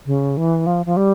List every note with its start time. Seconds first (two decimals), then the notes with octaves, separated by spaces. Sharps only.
0.06 C#3
0.37 E3
0.67 F3
0.86 F3
0.97 G3